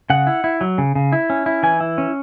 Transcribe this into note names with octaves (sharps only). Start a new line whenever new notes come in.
C#3 F#5
E4
E4
F#3
C#3
C#3
E4
C#4
E4
E3 G#5
E4
C#4